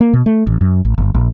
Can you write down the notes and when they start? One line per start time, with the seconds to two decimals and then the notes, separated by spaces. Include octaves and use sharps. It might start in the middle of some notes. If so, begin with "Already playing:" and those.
0.01 A#3
0.13 B2
0.26 A3
0.47 A1
0.61 F#2
0.85 A1
0.98 G1
1.14 A#1